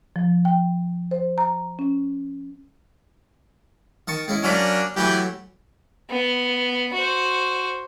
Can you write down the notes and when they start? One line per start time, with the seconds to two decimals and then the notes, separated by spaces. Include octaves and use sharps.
0.16 F3
0.45 G5
1.11 C5
1.38 A#5
1.79 C#4
4.08 D#3 A5 C#6
4.28 G#3 C#4 E4
4.43 F#3 A#3 C#4 D4 B5 D6
4.97 E3 F#3 A3 G4
6.10 B3
6.94 F#4 C5